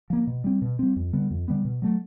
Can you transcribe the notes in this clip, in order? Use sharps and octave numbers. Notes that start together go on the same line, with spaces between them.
F3 A#3
B2
G3 C4
B2
G3 C4
F2
D3 G3 B3
F2
D3 G3 B3
B2
F#3 A3